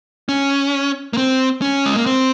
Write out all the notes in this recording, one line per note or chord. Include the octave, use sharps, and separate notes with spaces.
C#4
A#3
C4
C#4
G#3
A#3
C4